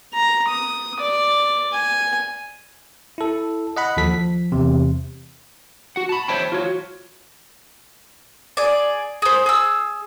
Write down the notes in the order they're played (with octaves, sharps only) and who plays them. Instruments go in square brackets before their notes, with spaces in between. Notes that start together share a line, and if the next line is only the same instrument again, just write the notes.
[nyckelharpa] A#5
D#6
D5
G#5
[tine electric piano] E4 A4
D#5 F#5 B5
D#2 F3 A4 B6
F3
E2 C3
[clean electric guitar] F#4 F#5
A5 B5
C5 C#5 E5 G5 A5 B5
F4 F#4 C#5
[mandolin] G#4 D5
G#4 C5
G#4 E6